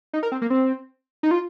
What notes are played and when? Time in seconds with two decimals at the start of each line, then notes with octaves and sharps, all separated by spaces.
0.13 D#4
0.23 A#4
0.32 C4
0.42 A#3
0.50 C4
1.23 D#4
1.31 F4